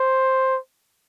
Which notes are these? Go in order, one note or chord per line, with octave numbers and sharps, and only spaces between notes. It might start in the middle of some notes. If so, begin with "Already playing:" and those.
Already playing: C5